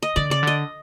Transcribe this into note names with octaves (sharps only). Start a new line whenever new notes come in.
D#5
D3 D5
C#3 D5
D3 D#5